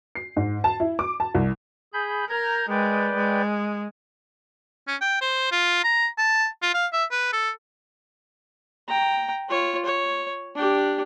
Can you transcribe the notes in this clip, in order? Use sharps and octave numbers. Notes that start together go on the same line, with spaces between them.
C7
G#2
A5
E4
D6
A5
C2
G#4 B5 G6
A#4 A#5 G6 G#6
G#3 B4 D5 G5
G#3
C#4
G5
C5
F4
A#5
A5
F4
F5
E5
B4
A4
G5 A#5
F4 C#5
C#5
D4 G4